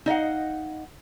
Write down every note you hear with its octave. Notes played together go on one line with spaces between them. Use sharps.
D#4 D#5 F5 F#5